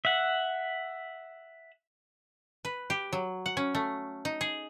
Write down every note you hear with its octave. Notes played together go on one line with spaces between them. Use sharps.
E5 F#5
B4
G4
F#3
F#5
C#4
A3
D#4
G#4